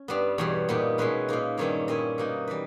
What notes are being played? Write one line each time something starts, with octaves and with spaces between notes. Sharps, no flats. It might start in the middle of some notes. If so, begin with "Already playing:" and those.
Already playing: C#4
G2 G3 B3
E2 B2 G3 C#5
A#2 G3 B3 D#4
B2 G#3 C#4 E4 B4
A#2 A#3 D#4
G2 D#3 G3 C#4 E4 C#5
A#2 G3 C#4 E4 D#5
B2 A#3 D#4
E3 G3 B4